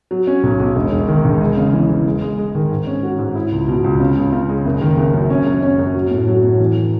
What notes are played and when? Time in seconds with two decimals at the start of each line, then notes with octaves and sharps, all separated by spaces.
0.11 F#3
0.27 C#4
0.43 B1
0.60 B1
0.76 E1
0.92 E1
1.09 D#3
1.25 E1
1.41 G#3
1.57 C#3
1.73 E3
1.89 E3
2.06 G#3
2.22 G#3
2.38 G#3
2.55 D#3
2.71 G#2
2.87 C#4
3.03 F#4
3.19 G#2
3.35 E4
3.52 C#2
3.68 B2
3.84 C#2
4.00 C#3
4.17 C#2
4.33 C#3
4.49 G#3
4.65 F#1
4.81 D#3
4.98 F#1
5.14 F#2
5.30 C#4
5.46 F#2
5.63 C#4
5.79 F#2
5.95 F#3
6.11 A2
6.27 F#3
6.43 A2
6.60 E3